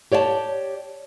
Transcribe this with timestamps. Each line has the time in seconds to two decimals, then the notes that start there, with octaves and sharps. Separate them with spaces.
0.12 G4 C#5 D5 E5 A5